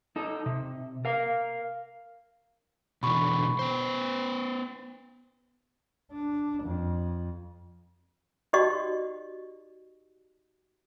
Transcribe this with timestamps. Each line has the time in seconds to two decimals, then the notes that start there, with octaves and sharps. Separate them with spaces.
0.16 D#4 A4
0.46 C3
1.05 A#4 F5
3.03 B2 D3 E3 B5 C#6
3.59 B3 C5
6.12 D4
6.63 F2
8.53 D#4 F#4 G4 D5 D#5 C#6